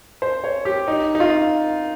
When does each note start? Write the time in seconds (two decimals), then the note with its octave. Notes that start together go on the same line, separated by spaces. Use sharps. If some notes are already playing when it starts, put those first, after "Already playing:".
0.22 C5
0.44 C#5
0.65 G4
0.88 D#4
1.15 D#4
1.20 F4